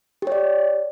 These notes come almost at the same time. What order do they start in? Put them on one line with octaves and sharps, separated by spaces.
G4 C#5 D5